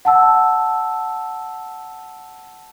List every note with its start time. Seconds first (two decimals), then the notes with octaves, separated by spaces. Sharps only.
0.05 F#5 A5 E6